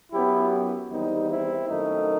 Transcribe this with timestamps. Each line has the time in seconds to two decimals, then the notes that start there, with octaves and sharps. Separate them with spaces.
0.12 F#2 F#3 B3 E4 G4
0.90 E2 D#3 G3 C4 D#4
1.29 C4 E4
1.69 F#2 D#3 A3 C4 D#4